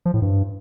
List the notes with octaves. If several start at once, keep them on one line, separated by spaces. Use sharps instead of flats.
F3
A2
G2